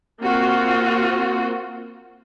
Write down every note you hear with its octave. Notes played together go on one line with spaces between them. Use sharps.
A#3 C4 F4 F#4